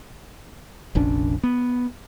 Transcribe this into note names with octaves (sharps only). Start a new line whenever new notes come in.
F1 A#1 C#4 D4
B3